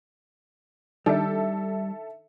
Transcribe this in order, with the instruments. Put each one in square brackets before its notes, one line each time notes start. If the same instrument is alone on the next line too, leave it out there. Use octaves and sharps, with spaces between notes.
[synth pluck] D#3 D4 D#4 [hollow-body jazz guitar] G3 [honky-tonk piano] A4 E5